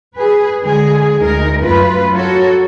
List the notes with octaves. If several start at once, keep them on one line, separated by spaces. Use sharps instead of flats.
G#4 B4
D3 G#3 G#4
D2 D#4 A#4
F#2 A3 F4 B4
F#4 A4 A#4 C#5